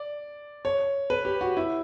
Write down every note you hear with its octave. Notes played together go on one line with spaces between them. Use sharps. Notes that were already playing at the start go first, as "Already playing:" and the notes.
Already playing: D5
C#5
B4
G4
F#4
E4